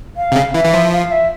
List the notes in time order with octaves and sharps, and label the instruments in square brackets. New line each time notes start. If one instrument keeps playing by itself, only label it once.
[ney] F5
[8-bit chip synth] C3
C#3
[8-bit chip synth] E3 [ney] E5
[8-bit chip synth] E3
F3
[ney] F5
E5